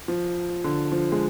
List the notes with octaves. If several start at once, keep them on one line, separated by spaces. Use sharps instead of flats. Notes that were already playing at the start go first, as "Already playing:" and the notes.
F3
D3
F3
G#3